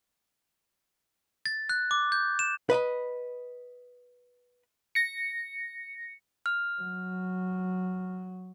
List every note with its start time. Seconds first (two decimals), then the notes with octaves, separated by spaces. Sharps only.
1.46 A6
1.69 F#6
1.91 D6
2.12 G6
2.39 E7
2.70 B4 D#5 A#5 B5
4.95 A#6 C#7
6.46 F6
6.82 F#3